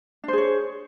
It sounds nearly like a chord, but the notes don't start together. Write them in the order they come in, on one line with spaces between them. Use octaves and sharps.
D4 C5 G#4 C#5